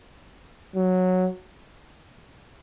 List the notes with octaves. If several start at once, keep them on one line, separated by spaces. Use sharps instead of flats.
F#3